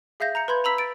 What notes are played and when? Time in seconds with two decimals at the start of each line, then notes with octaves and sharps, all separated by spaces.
0.20 G#4 E5 F5 G6 A#6
0.35 A#5 G6 C#7
0.48 B4 B5 C6 G6 G#6
0.64 A#5 B5 E6 B6
0.78 A6 D7